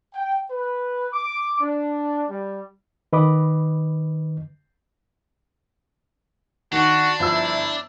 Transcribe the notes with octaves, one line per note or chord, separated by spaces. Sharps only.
G5
B4
D6
D4
G3
D#3 B4 D#5 B5 D6
D#3 D4 F#4
G1 F3 E4 E6